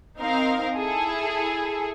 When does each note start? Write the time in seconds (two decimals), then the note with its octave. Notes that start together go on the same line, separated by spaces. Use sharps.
0.18 C4 D#4 A#4 F5
0.76 E4 G#4 A4